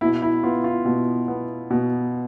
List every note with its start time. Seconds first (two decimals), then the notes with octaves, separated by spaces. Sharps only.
0.01 B2 E4
0.22 E4
0.43 B3 F4
0.64 F4
0.85 B2
1.28 B3
1.70 B2